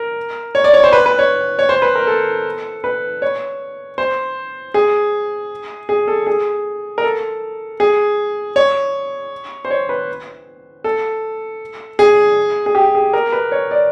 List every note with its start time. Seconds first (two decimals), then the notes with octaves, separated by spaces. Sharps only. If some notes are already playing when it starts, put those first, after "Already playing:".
Already playing: A#4
0.55 C#5
0.64 D5
0.74 C#5
0.84 C5
0.93 B4
1.06 B4
1.19 C#5
1.59 C#5
1.69 C5
1.82 B4
1.95 A#4
2.07 A4
2.84 B4
3.22 C#5
3.98 C5
4.74 G#4
5.89 G#4
6.08 A4
6.27 G#4
6.98 A#4
7.04 A4
7.80 G#4
8.56 C#5
9.65 C5
9.71 C#5
9.89 B4
10.84 A4
11.99 G#4
12.66 G#4
12.75 G4
12.95 G#4
13.13 A#4
13.32 B4
13.52 C#5
13.71 D5